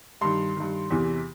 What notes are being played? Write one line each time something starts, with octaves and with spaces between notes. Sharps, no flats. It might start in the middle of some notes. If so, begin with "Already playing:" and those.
G2 D#3 C6
G2 D#3
E2 C3 E3